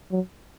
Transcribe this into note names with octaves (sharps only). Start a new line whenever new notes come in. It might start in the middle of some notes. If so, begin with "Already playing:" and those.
F#3